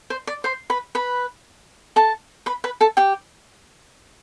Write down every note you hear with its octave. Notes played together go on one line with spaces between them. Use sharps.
C5
D5
C5 C6
B4 B5
B4 B5
A4 A5
B4 B5
B4 B5
A4 A5
G4 G5